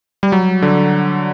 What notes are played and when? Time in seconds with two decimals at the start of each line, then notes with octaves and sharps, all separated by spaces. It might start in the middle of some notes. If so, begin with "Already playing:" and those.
0.23 G3
0.32 F#3
0.62 D3